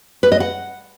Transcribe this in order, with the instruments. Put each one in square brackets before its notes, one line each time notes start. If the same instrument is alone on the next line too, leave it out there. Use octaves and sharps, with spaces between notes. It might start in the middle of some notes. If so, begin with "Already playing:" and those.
[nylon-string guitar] B4
D#5
F#5